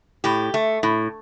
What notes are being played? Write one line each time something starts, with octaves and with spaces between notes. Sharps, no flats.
A2 G4
A3
A2